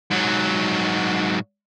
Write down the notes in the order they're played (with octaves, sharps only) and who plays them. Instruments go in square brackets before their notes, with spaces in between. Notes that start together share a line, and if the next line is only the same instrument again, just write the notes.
[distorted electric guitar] G#2 F#3